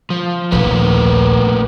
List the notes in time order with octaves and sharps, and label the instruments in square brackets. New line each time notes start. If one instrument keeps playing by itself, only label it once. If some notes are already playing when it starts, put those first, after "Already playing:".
[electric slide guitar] F3
[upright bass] A#1 D#2 [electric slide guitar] A3 A#3 B4